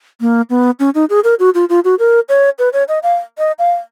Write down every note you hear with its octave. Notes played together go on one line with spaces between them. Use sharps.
A#3
B3
C#4
D#4
G#4
A#4
F#4
F4
F4
F#4
A#4
C#5
B4
C#5
D#5
F5
D#5
F5